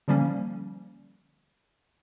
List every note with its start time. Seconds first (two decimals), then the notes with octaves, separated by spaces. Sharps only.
0.08 D3 F3 G3 A#3 C#4